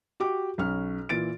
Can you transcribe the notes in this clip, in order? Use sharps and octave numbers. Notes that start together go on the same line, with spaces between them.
F#4 G4 D6
B1 C#4 F6
A#2 E3 A6 D7